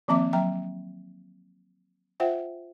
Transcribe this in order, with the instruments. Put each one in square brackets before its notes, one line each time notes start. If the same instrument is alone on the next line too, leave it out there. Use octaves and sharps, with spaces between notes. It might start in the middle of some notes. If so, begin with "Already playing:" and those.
[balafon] D#3 F3 A#3 C4 E5 D6
F#3 E5 G5 A#5
F4 C5 E5 F#5 G5